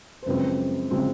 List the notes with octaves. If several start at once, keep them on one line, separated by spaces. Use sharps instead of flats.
C5
F#2 C#3 F3 G#3 C4 B4
C#3 F3 G#3 C4